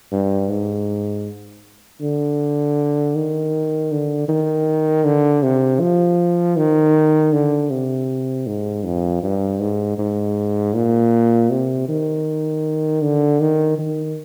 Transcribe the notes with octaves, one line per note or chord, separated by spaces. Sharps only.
G2
G#2
D3
D#3
D3
D#3
D3
C3
F3
D#3
D3
C3
G#2
F2
G2
G#2
G#2
A#2
C3
D#3
D3
D#3
D#3